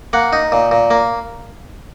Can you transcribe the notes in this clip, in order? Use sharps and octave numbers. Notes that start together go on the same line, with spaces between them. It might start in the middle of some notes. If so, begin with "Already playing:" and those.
A#3 F#5
D#4
A#2
A#2
A#3